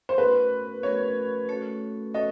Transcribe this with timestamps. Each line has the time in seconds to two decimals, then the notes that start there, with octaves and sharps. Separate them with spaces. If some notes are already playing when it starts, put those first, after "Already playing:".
0.09 C5
0.18 A3 C#4 F#4 A#4 B4
0.83 A3 C#4 F#4 A#4 C#5
1.49 A3 C#4 F#4 A4 C#5
2.14 A3 C#4 F#4 A4 C#5 D#5